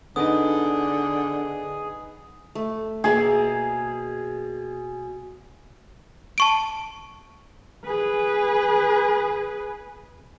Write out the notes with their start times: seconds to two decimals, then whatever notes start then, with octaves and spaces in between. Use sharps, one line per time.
0.16 D3 B3 D#4 G#4 D#6
2.55 A3
3.04 B2 A#3 G#4 E5
6.38 A5 C#6 D7
7.86 G#4 B4